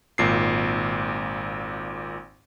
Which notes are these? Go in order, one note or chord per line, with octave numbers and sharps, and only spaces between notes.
G#1 A#2 C7